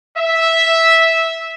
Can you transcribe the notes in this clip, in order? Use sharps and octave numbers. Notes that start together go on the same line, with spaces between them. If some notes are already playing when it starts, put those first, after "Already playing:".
E5